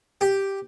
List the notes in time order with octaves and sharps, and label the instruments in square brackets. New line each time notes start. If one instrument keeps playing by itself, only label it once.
[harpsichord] G4